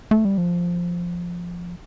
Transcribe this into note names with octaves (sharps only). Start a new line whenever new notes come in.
A3
G3
F3